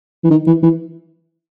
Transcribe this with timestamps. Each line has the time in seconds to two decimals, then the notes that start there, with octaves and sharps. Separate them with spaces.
0.24 E3
0.30 D#3
0.47 E3
0.63 E3